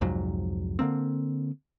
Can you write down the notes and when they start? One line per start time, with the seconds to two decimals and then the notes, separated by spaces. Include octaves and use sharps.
0.01 C2 F2 G#2 F#3
0.79 D3 E3 A#3 C4